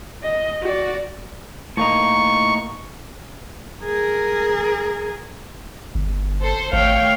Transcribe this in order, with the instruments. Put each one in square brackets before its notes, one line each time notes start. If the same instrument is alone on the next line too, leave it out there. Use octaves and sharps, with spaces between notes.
[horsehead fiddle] D#5
F#4 D5
[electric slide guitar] A2 A#3 D#4 [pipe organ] C#6
[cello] G#4 A#4
[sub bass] G1
[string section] A4 C5
[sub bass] G#1 [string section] A3 C#5 G5 [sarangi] F5